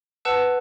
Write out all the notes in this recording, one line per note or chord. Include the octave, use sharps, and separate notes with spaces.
B4 F#5 A5 E6